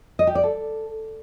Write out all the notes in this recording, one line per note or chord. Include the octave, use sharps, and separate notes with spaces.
D#5
G4
D5
A4